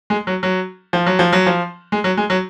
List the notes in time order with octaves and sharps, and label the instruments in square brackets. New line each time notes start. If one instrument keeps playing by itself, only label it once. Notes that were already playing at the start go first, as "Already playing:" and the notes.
[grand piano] G#3
F#3
F#3
F3
F#3
F3
F#3
F3
G#3
F#3
G#3
F#3